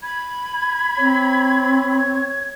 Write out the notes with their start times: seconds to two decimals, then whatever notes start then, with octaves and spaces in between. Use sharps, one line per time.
0.02 B5 G#6
0.98 C4 C#5